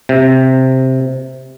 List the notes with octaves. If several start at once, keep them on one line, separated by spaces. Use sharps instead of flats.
C3